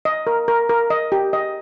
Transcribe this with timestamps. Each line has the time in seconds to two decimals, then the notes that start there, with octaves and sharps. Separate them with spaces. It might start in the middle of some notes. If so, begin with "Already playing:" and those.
0.05 D#5
0.27 A#4
0.48 A#4
0.69 A#4
0.90 D#5
1.12 G4
1.33 D#5